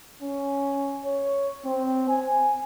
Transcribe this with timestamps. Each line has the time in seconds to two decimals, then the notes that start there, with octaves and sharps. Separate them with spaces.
0.22 C#4
1.05 C#5
1.65 C4
2.09 G#5